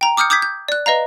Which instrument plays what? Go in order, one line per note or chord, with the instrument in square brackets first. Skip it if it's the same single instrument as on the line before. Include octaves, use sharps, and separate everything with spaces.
[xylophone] G5 A#5
D6 D#6 F6 G6 C#7
D6 D#6 G6 G#6 B6
G6
D5 F#6
B4 D#5 F5 A#5